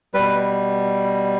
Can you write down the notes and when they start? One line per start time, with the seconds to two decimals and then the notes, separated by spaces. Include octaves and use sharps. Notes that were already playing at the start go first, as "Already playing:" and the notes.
0.14 B2 G3 B4